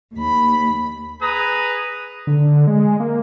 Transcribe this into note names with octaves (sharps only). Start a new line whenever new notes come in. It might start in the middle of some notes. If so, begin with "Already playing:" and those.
D#2 B5
G#4 B4 A#5 D#6
D3
G#3
A#3